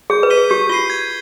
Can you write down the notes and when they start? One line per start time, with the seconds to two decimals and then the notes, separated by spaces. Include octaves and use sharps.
0.10 G#4 G6
0.23 B4
0.30 B6 D#7 G7
0.37 G#4
0.50 G4 G6
0.69 F4 C7 D#7 G7
0.90 G#6